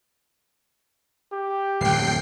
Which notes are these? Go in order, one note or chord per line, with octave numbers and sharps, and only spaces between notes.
G4
D1 F2 G5 C7